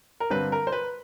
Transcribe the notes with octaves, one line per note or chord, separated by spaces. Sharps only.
A#4
G2 D3 G3 C4 B4
A#4
C5
B4